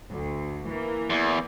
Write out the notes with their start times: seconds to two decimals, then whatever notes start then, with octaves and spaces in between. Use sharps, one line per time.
0.13 D2
0.69 E3 A#3
1.10 E2